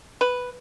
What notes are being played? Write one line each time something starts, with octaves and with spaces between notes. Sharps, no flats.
B4